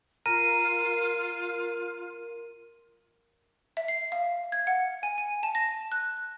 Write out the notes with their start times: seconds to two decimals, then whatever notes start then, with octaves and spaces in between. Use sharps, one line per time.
0.26 F4 A#4 D#7
3.77 E5
3.88 C7
4.12 F5
4.52 G#6
4.67 F#5
5.03 G#5
5.18 D#7
5.43 A5
5.55 A#6
5.92 F#6